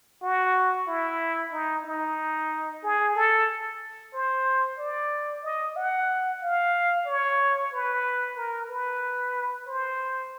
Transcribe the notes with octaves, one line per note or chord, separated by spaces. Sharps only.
F#4
E4
D#4
D#4
G#4
A4
C5
D5
D#5
F#5
F5
C#5
B4
A#4
B4
C5